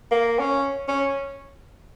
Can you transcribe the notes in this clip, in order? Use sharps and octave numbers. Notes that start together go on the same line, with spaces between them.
A#3
C#4
C#4